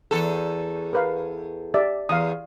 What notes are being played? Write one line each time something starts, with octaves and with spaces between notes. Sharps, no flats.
E2 A4
A#4 B4 F5
G4 D5 E5
E2 F5 D#6